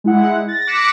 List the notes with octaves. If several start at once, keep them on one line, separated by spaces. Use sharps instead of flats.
G#3 E4 F#5
A6 A#6
D6 F#6 A#6 B6 C#7 E7